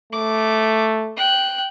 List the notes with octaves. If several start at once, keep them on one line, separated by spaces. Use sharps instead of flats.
A3 D6
G5 F#6